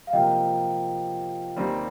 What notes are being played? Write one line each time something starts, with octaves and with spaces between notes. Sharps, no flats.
F5
C3 F3 A#3 D#5 G5
D#2 D#3 G3 C4